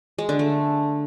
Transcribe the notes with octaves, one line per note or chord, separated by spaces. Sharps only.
G#3
D3
A3